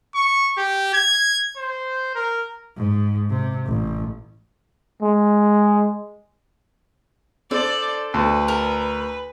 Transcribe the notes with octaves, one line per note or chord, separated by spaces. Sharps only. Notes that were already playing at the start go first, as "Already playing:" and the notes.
C#6
G4
G#6
C5
A#4
G#2
C3
A1
G#3
D4 A4 C5 D5
D2 B4
A#4